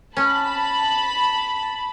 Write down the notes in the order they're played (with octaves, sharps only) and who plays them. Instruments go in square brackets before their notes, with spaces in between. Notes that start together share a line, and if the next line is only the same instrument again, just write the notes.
[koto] C#4 [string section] A5 B5